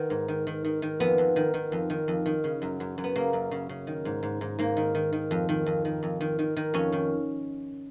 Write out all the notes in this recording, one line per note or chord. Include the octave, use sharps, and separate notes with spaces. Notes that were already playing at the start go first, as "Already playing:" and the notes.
Already playing: D#3 B3
G#2
D#3
D#3
D#3
D#3
F2 B3
F2
D#3
D#3
F2
D#3
F2
D#3
C#3
F#2
F#2
F#2
B3
C#3 A#3
F#2
C#3
C#3
D#3
G#2
G#2
G#2
G#2 A#3
D#3
D#3
D#3
F2
D#3
F2
D#3
F2
D#3
D#3
D#3
F2 C#4
D#3